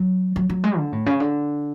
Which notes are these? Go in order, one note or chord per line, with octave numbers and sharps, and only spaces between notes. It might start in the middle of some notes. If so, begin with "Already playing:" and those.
Already playing: F#3
F#3
F#3
G#3
D3
A2
C#3
D3